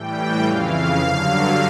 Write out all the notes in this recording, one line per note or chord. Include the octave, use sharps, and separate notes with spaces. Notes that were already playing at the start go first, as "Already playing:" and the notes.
Already playing: A2 E3 G3 G5
F2 C#3 E3 F5
G2 D3 F#3 F5